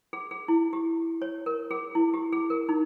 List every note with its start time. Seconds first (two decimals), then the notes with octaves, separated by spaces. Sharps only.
0.13 G#4
0.31 G#4
0.48 E4
0.73 G4
1.22 C#5
1.46 A#4
1.71 G#4
1.95 E4
2.14 G4
2.32 G#4
2.50 A#4
2.69 D#4